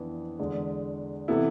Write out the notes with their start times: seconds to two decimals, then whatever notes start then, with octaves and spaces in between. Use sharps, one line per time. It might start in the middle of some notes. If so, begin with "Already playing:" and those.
Already playing: F2 E3 B3 D4
0.39 E2 D3 G#3
1.28 C3 E3 B3 E4 A4